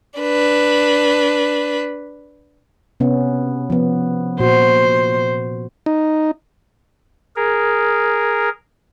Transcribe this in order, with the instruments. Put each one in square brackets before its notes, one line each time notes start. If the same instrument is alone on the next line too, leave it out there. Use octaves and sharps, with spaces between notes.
[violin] D4 B4
[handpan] C3 B3 C#4
F3 B3
[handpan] A#2 F#4 [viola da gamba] C5
[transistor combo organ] D#4
[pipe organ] G#4 A#4